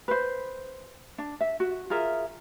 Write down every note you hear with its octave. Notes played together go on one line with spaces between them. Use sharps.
B4 C5
D4
E5
F#4
F4 G#4 A#4 E5